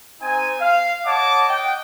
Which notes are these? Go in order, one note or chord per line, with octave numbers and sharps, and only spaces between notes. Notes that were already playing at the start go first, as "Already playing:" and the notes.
C4 D#4 G#5
F5
C#5 D#5 F#5 A5 D6
D#5 F#5 G5